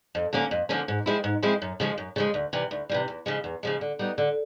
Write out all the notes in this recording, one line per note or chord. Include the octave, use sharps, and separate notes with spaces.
F2
D3 F3 A#3 C#4
F2
D3 F3 A#3 C#4
G#2
F3 G#3 C4 E4
G#2
F3 G#3 C4 E4
F#2
C#3 F3 G#3
F#2
C#3 F3 G#3
D2
C3 E3 G3
D2
C3 E3 G3
E2
C#3 F3 G#3
E2
C#3 F3 G#3
D3
G3 B3 D#4
D3